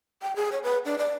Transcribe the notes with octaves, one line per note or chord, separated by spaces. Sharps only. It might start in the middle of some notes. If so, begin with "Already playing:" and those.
G5
G#4
C#5
B4
D4
D5